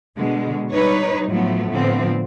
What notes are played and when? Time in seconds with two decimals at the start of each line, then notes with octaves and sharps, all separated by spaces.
0.17 B2 D3 G#3
0.71 G3 D#4 B4 C#5
1.29 A2 F3 F#3 A3 B3
1.72 A2 D3 F3 B3 C4